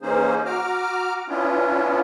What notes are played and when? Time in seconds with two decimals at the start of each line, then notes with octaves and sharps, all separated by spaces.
0.02 E3 A#3 C#4 D#4 G#4 C5
0.45 F#4 A#5 D6 F6
1.29 B3 C#4 D4 E4 F4